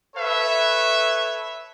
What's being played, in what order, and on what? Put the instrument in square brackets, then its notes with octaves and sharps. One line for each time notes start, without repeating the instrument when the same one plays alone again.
[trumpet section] A4 B4 C#5 E5